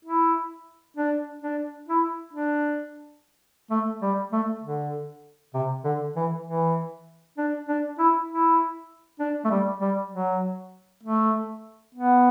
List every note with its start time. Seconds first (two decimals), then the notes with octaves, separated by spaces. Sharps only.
0.05 E4
0.97 D4
1.42 D4
1.88 E4
2.33 D4
3.70 A3
4.02 G3
4.32 A3
4.63 D3
5.54 C3
5.84 D3
6.16 E3
6.46 E3
7.38 D4
7.68 D4
7.99 E4
8.29 E4
9.20 D4
9.44 A3
9.51 G3
9.81 G3
10.11 F#3
11.03 A3
11.95 B3